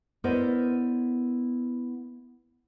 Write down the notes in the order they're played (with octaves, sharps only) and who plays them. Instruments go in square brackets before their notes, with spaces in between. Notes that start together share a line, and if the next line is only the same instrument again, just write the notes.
[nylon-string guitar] B3 E4 A#4 C5 D5 D#5